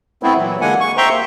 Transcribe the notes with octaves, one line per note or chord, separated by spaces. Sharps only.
A3 B3 C4 E4
A#2 E3 F#3
D3 G#3 A#3 F#5 G#5
C#6
C5 E5 G5 A#5 C6 C#6
A#3